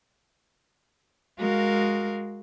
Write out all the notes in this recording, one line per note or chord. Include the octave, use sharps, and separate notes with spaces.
G#3 F#4 A#4 F5